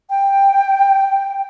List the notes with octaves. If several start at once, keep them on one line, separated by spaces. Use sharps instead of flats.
G5